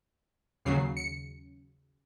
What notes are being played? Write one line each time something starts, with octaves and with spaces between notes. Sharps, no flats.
D#2 C#3 F#3 C7
C#7